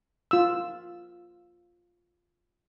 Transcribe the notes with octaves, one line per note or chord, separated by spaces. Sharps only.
F4 E6